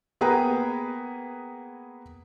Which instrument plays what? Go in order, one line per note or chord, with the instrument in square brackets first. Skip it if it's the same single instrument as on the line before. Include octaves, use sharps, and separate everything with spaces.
[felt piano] A#3 B3 G#4 B4 G5 A#5